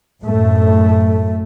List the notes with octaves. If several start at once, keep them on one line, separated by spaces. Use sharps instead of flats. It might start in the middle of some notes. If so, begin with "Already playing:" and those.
F#2 A2 A3